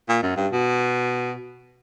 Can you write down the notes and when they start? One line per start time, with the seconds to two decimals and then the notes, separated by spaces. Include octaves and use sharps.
0.09 A#2
0.22 F#2
0.36 G2
0.52 B2